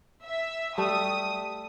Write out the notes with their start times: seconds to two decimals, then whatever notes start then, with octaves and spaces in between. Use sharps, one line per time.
0.24 E5
0.78 G3 A3 E5 D#6